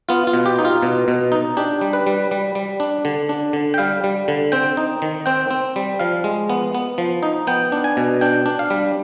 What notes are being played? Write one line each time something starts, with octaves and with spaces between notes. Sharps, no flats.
B3 F4
F4
B2
G4
D#4
F4
B2
B2
D#4
D4 G4
G3
B4
G3
G3
G3
D4
D3
D4
D3
G5
G3 F5
G3
D3
C4 G5
D#4
D#3
C4 G5
C4
G3
F3 F5
G#3
B3
B3
F3
D#4
B3 G5
D4
G#5
B2
D4 G5
D4
F5
G3